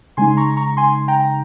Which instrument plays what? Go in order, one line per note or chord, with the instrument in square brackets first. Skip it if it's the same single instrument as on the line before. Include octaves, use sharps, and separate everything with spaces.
[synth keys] C#3 G#3 D#4 G#5 C6
C6
A#5 C#6
A#5 C#6
G#5 C6
G5 A#5